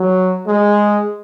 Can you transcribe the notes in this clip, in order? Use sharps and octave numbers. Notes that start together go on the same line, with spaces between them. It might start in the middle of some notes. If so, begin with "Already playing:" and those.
Already playing: F#3
G#3